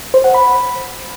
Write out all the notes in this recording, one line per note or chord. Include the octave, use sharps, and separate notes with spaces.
C5
F#5
B5